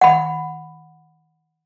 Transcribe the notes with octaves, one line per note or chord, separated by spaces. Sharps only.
F#5 B5